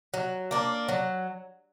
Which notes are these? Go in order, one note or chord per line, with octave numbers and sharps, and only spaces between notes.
F#3
A#3 D4
F#3